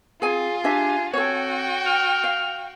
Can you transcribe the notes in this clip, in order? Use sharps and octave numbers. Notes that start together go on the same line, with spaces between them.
C4 F4 G#4 G#5
D4 G4 E5 G#5
C4 F#4 A4 C#5 G5
F6
F5